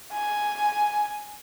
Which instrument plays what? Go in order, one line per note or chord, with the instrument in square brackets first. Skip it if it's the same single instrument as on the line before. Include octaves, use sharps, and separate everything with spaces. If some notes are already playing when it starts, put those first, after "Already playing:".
[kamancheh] G#5